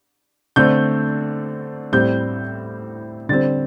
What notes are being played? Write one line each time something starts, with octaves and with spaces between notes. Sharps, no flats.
D3 A3 C4 G6
A2 G3 C4 G6
D3 G3 C4 A6